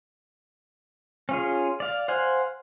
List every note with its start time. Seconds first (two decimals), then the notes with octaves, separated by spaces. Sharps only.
1.29 C#4 F4 G#4
1.80 D5 F5
2.08 C5 F5 F#5 G#5